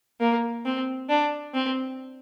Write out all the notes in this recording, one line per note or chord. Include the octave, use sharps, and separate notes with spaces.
A#3
C4
D4
C4